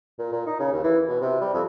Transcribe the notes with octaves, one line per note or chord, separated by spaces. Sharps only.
A#2
A#2
D#4
C#3
D#2
E3
B2
C3
G3
F2